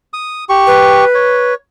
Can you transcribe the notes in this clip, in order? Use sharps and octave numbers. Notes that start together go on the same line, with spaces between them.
D#6
G4 C#6
B4
C#5